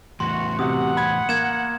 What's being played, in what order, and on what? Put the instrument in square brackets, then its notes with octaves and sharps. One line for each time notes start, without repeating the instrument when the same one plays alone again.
[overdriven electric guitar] E2 A2 [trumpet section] F#4 [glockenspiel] C6
[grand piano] C3 F#4 [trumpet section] F#5 [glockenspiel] D#6
[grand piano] B5 G#6
[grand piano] A#3 [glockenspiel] G#6 E7